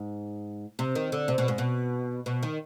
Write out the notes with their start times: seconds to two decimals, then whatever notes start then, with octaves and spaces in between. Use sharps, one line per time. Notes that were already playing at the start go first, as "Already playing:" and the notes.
Already playing: G#2
0.79 C3
0.95 D#3
1.12 D3
1.28 C3
1.38 B2
1.48 G#2
1.58 B2
2.26 B2
2.43 D#3